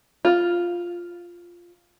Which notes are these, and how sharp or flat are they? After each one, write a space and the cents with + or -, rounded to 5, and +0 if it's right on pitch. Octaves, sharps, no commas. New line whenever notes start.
F4 +0